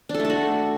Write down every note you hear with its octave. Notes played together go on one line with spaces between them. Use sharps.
D4
A4
A3
A4
F#4